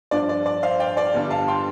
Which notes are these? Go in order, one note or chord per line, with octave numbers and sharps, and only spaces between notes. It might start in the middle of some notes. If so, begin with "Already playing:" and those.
G2 F3 D4 D5
D5
D5
C5 F5
D5 G5
D5 G5
G1 G2 G3 D4
F5 A5
G5 C6